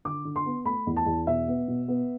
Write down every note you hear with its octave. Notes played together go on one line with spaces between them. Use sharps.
D3 D6
D3
C6
B3
A3 B5
E2
A5
E2
B2 E5
B3
B2
B3